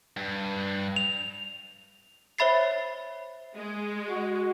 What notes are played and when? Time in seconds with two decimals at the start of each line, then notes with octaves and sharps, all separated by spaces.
0.17 G2
0.96 F7
2.38 C5 C#5 E5 B5 A6 C7
3.55 G#3
4.09 F#4